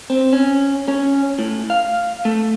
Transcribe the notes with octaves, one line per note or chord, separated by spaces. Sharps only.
C4
C#4
C#4
A2
F5
A3